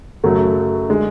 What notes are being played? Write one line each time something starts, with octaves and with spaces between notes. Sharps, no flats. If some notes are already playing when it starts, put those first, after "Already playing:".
F#2 C#3 F#3 A3
D3 G#3